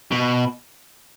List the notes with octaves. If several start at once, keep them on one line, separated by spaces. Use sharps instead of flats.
B2